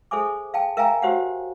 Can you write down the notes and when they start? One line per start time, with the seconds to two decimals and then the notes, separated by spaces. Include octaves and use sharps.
0.11 G#4 A4 C5 E5 G#5 D6
0.54 F5 G5 A5
0.77 A#4 E5 F5 G5 G#5 A#5
1.02 F#4 G4 C5 C#5 F5 F#5